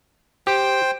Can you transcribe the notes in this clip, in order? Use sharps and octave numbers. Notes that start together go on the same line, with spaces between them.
G4 C5 G5